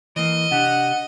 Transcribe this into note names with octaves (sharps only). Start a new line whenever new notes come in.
E3 A#3 D#5
C3 D4 G4 F#5